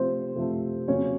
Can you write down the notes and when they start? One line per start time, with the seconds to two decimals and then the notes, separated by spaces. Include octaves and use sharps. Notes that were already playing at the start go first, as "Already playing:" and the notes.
Already playing: C3 F3 A3 C4 C5
0.35 C3 F3 A3
0.88 F2 C#3 F#3 A#3 C#4 C#5